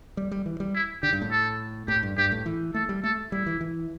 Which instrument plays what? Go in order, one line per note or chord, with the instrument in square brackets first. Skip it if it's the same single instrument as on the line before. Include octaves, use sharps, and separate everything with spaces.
[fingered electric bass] G3
G3
E3
G3
[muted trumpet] E4
[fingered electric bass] D3 [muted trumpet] G4
[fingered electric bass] G2
A2
[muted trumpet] A4
[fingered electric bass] A2 [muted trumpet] G4
[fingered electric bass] G2
[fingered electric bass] G2 [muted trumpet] G4
[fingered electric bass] A2
E3
[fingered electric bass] A3 [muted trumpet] A4
[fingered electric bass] G3
[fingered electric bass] A3 [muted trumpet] A4
[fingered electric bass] G3 [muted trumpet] E4
[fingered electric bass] E3
E3